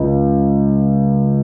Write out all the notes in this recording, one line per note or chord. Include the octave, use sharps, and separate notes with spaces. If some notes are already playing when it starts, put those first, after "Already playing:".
Already playing: C#2